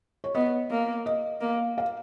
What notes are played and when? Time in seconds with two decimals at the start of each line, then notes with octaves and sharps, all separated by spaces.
0.24 C#5
0.35 B3 D#5
0.71 A#3
1.06 D#5
1.41 A#3
1.78 F5